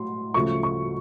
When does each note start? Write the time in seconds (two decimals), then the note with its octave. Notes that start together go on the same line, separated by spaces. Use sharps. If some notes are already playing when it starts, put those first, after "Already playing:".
Already playing: A2 F#3 C6
0.34 D2 C#3 F3 A3 C#6
0.63 C#6